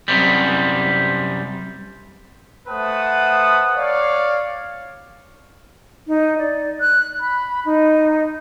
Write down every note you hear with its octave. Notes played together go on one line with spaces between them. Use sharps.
F#2 C3 G3
A3 B4 C5 F#5 A5 D#6
C#5 D5 F5
D#4
D5
F#6
B5
D#4